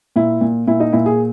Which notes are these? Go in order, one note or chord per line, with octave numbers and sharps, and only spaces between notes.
A#2 E4
A#2
A#2 E4
D#4
A#2 E4
G#4